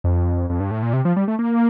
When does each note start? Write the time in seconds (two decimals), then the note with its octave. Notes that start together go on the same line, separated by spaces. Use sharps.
0.04 F2
0.50 F2
0.60 G2
0.71 A2
0.83 A#2
0.93 C3
1.05 F3
1.17 G3
1.28 A3
1.39 A#3